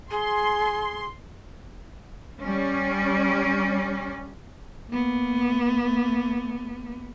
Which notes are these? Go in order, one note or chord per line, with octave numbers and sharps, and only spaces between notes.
G#4 C6
G3 C#4
A#3 B3